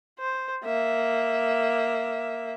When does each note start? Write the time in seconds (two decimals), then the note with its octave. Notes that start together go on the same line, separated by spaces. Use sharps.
0.20 C5
0.65 A#3 E5